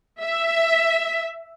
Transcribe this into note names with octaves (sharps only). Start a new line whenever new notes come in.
E5